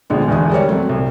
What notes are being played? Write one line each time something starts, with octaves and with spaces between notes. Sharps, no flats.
A#1 B2 D3 G#3
E1 E2 D3 E5 D#6
G3 A#4 C#5 D5
F#3 A3 C4
C2